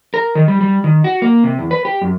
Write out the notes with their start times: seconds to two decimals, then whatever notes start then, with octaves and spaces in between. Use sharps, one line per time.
0.14 A#4
0.35 D#3
0.48 G3
0.61 G3
0.84 D#3
1.04 F#4
1.22 A#3
1.44 C3
1.59 E2
1.71 B4
1.85 G4
2.01 F#2